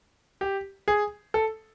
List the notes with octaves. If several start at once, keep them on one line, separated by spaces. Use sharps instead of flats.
G4
G#4
A4